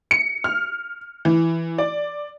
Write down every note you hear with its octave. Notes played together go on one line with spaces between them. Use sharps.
C#7
F6
E3
D5